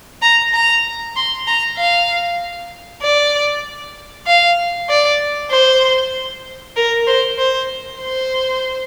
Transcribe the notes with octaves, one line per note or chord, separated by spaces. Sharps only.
A#5
A#5
C6
A#5
F5
D5
F5
D5
C5
A#4
C5
C5
C5